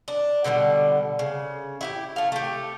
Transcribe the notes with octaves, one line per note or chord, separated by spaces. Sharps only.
D4
B2 D3 D#3 G3
C#3
E4 F#4 G4
A3 F5
A3 G4